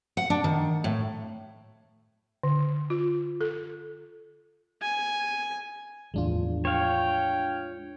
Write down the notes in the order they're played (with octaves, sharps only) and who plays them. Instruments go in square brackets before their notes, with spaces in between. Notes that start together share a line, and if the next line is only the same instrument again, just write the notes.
[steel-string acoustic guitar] F#5
D4
D#3
A2
[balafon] D3
F4
A4
[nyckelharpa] G#5
[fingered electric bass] E2 A2 F3 [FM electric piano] G#3 D4 F4
[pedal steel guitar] C#5 F5 [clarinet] G5